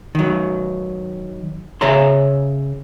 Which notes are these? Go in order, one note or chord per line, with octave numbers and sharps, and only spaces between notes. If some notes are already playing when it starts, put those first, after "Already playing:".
D#3 F#3
C#3 G#4 C#5 E5 A#5 C6